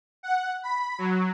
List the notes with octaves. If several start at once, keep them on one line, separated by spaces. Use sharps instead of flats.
F#5
B5
F#3